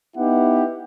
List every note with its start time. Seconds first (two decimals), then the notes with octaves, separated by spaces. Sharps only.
0.16 B3 D#4 E4 G4 F#5